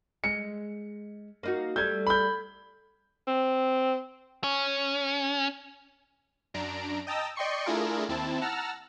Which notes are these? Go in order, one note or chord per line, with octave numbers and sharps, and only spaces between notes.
G#3 C#7
A#3 D#4 F#4
G3 A3 G6 G#6
B5 G6
C4
C#4
F#2 D4 A#5 D7
D#5 G5 A5 A#5 D#6 E6
D5 D#5 G5 C6 C#6 C#7
A3 D4 E4 F4 G#4 A#4
D#2 C4 E4 A5
F#5 A5 A#5 E6 F6